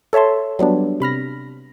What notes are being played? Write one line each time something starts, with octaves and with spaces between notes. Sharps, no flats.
A4 C#5 E5 A5 C6
F#3 G3 B3 D4
C3 B5 F6 A#6